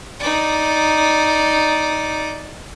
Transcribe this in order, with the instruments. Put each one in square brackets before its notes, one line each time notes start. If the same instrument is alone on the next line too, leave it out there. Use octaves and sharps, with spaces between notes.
[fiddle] D#4 D5